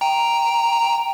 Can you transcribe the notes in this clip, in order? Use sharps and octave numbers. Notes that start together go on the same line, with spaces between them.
G5 A#5